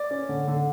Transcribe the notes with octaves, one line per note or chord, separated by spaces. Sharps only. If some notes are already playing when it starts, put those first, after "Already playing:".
Already playing: D5
C#4
D3
D3